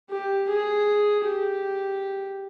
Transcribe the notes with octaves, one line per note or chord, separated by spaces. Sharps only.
G4
G#4
G4